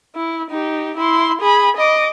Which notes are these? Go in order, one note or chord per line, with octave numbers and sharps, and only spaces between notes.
E4
D#4 G4
E4 C6
G#4 B5
D#5 D6